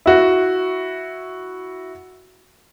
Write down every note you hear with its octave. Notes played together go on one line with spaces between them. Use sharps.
E4 F#4